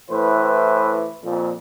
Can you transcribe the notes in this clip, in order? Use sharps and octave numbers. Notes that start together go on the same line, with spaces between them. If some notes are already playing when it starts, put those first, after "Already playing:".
A2 E3 B4 C5
F2 A#2